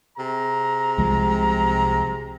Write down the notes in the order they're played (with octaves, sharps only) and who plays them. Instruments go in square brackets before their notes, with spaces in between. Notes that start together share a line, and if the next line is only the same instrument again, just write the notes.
[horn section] C3 G#4 A#5
[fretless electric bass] C2 F3 G#3